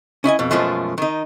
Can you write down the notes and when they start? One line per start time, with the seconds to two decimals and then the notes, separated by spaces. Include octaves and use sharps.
0.24 C#4 E4 D#5 G#5
0.39 F2 B2
0.51 F#2 B2 F3 G#3 A3
0.98 D#3 D#4